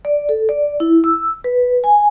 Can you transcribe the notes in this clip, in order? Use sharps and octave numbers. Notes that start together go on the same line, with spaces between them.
D5
A4
D5
E4
E6
B4
G#5